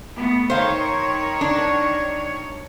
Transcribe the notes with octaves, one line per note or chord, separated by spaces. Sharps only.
A3 B3
D#3 C5 C#5 F5
D4